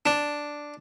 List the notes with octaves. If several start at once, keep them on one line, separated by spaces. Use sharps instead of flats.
D4